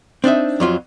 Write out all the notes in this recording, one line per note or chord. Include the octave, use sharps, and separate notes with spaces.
C4 D4 D#4 E5
F2 F#3 F4